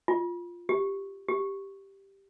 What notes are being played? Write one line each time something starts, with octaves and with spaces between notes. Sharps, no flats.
F4
G4
G4